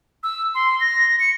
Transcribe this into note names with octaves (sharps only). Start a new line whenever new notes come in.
E6
C6
A#6
C#7